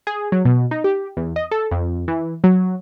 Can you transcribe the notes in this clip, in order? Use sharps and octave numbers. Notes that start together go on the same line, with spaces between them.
G#4
F#3
B2
D#4
G4
E2
D#5
A4
F2
E3
F#3